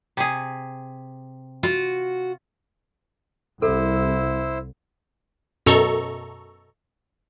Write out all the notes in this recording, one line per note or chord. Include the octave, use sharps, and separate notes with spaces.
C3 G#4
F4 F#4
C2 E4 A4 C5 E6
F#2 B2 A4 A#5 C#6